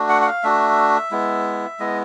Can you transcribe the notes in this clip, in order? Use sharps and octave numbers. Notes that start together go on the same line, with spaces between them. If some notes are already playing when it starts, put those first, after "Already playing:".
Already playing: A3 D4 F#4
F#5
F#5
F5
A3 D4 F#4 E5
G#3 B3 E4
G#3 B3 E4 D#5